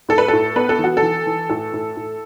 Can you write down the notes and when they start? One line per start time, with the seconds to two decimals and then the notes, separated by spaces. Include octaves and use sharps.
0.09 A2 A4
0.18 B4
0.28 A2 A4
0.56 B3 B4
0.69 A4
0.79 E3 F#4
0.97 A4
1.02 E3
1.27 E3
1.50 A2 A4
1.74 A2
1.97 A2